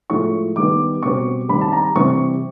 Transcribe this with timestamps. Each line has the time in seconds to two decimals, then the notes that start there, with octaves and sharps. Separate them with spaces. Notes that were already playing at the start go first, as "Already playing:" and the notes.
0.10 A2 F3 G#3 C#6
0.56 D#3 G3 B3 D6
1.03 B2 G3 C4 C#6
1.49 D#3 G3 C4 B5
1.61 A5
1.72 A#5
1.95 C3 E3 G3 C4 C#6